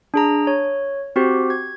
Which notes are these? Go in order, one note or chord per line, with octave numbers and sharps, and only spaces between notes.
D4 G#4 A#5
C#5
C4 F#4 G4 C5
G#6